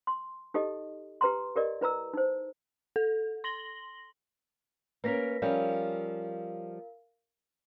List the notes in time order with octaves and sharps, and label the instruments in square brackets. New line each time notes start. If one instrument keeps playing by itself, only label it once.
[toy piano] C6
D#4 G4 A4 D#5
G4 B4 A#5 C6
G4 A#4 D5 D#5
E4 B4 A#5 E6
D#4 C5
[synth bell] A4
C6 A#6 F#7 G7
[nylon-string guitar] A#3 C#4 A#4 [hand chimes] B4 A#6 B6
[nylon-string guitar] F3 G3 C#4 [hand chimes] A#4 F5